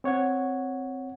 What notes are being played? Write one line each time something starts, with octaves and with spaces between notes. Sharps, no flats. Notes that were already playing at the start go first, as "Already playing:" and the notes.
C4 C#5 F#5 G#6